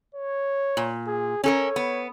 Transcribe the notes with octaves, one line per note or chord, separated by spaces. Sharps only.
C#5
A#2
G#4
C#4 A4 A#4 C#5
B3